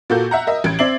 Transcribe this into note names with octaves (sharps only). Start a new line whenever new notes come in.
A#2 A#3 F#4 A4 G6
E5 F#5 A#5
A#4 D#5 E5
A1 G#6 D7
C4 D5 E5 C7 F#7